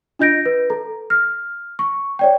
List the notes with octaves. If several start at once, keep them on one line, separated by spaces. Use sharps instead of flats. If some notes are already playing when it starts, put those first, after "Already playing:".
D4 F4 D#5 G6 A#6 D7
B4
A4 A#5
F6
C#6
C#5 D5 G5